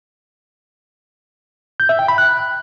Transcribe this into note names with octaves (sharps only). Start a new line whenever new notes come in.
G6
E5
G5
B5
F#6